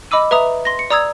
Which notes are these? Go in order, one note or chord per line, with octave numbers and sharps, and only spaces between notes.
D#5 B5 D6 E6 D#7
B4 E5 A#5 D#6
C6 A#6
C#7
D5 A#5 D#6 E6 G#6